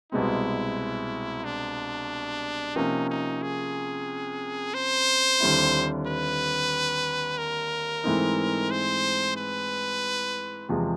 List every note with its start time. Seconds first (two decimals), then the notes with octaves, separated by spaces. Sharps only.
0.12 C2 B2 G#3 C4 E4
1.44 D4
2.76 C3 F3 A#3 C#4 D#4
3.10 D#4
3.42 G#4
4.74 C5
5.40 D#2 D3 G3 C4 E4
6.07 B4
7.38 A#4
8.04 G#2 E3 A3 C4 D#4
8.71 C5
9.37 B4
10.69 E2 C3 F3 G#3